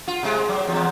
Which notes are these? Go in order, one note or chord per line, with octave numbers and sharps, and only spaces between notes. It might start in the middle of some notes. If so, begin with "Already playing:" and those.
F4
C3 G#3
F#3
E2 G#2